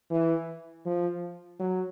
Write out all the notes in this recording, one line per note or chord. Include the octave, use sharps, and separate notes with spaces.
E3
F3
F#3